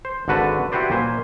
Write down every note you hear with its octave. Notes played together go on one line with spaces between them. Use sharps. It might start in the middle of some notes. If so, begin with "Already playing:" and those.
C5
G#1 D3 F#4 B4 A5
E4 F#4 G4 B4 C5 D5
A#2 C5 G#5